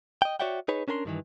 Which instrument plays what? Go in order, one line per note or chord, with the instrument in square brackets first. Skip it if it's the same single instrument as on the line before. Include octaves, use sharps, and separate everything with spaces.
[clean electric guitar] D#5 G5
F#4 C#5 D5 E5 F#5 G5
D#4 G#4 B4 C#5
C#4 D4 A#4 G#5 C6
G2 D#3 E3